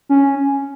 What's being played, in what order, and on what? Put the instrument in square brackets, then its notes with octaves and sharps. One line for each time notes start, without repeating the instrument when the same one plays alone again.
[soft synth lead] C#4